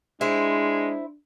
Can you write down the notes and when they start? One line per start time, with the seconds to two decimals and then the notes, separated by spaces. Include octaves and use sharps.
0.21 G#3 D4 E4 C5